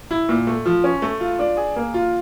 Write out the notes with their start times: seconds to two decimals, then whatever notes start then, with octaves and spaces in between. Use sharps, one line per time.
0.11 E4
0.29 A#2
0.47 A3
0.66 F3
0.84 C#4
1.02 A3
1.20 F4
1.39 D4
1.57 G#4
1.76 A#3
1.94 F4